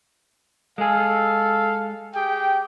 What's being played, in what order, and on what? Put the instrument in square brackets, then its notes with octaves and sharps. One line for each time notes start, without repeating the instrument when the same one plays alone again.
[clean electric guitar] G#3 G#4 [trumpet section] A4 F5
[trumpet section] G4 G#4 G5